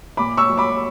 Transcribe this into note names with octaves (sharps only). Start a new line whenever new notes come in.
A#2 B5 D6
C#6 E6
F#3
B5 D6